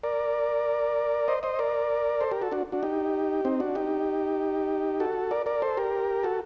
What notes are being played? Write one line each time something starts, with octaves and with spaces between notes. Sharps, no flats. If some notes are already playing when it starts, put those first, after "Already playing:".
A#4 D5
C5 D#5
C5 D#5
A#4 D5
A4 C5
G4 A#4
F#4 A4
D4 F#4
D4 F#4
D#4 G4
C4 D#4
D4 F#4
D#4 G4
F#4 A4
A#4 D5
A#4 D5
A4 C5
G4 A#4
F#4 A4